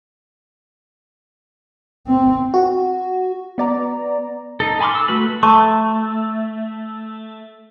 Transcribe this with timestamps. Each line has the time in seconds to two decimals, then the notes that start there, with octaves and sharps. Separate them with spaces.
2.07 C4
2.54 F#4
3.58 B3 D5 A#5
4.60 D#4 A4
4.81 G#5 B5 C6 D6 F6
4.95 E6
5.08 A3 F#4 B4 B5
5.43 A3 A5 C#6